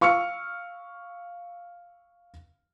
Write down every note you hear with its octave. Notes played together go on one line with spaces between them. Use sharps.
F5 C#6 E6 F6 C#7